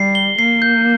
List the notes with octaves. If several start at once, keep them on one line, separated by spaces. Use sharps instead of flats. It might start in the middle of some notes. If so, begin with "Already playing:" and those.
Already playing: G3 C7
G7
A#3 C7
G6